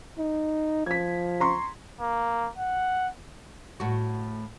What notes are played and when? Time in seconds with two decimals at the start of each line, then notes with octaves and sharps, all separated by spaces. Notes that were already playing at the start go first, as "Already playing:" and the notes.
0.18 D#4
0.86 F3 G#6 B6
1.40 A#5 C6 C#6
2.01 A#3
2.58 F#5
3.80 A2 F#4